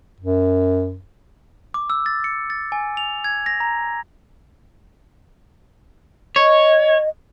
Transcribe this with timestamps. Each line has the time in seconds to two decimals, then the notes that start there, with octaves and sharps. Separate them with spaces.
0.21 F#2
1.74 D6
1.90 E6
2.06 A6
2.24 C#7
2.50 A6
2.72 G#5
2.97 F7
3.24 G#6
3.46 A#6
3.60 A#5
6.36 C#5 D#5